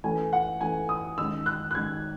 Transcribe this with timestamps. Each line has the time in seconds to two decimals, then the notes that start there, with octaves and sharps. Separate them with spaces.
0.04 E3 A3 C#4 G#5
0.33 F#5
0.61 E3 A3 C#4 G#5
0.89 D#6
1.18 D#3 G#3 C#4 E6
1.46 F#6
1.71 F#6
1.74 D#3 G#3 C#4 G#6